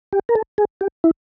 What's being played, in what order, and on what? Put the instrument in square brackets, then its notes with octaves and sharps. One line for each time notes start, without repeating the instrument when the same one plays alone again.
[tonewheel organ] G4
A#4
A4
G#4
G4
E4